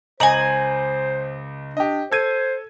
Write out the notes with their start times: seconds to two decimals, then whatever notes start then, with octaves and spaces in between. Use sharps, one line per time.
0.20 C#2 C5 D#5 G#5 A#5 F#7
1.77 D4 G4 D#5
2.11 A4 C5 G#6 D#7